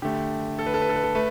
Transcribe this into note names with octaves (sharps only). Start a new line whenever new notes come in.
D3 A3 G4
A4
B4
A4
B4
A4
B4
A4
A3 B4